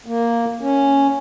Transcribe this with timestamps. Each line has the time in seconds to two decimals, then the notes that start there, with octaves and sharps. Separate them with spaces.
0.06 A#3
0.61 C#4